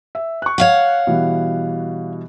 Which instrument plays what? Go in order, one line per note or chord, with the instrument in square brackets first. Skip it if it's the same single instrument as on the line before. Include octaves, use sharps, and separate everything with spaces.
[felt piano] E5
C#6 F#6
[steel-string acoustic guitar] C#5 F5 F#5
[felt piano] B2 E3 G3